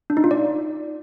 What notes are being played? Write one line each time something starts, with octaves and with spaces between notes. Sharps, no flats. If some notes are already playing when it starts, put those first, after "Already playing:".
D4
D#4
F4
D5